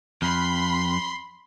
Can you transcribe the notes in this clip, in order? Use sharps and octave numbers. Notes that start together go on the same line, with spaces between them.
F2 B5 C6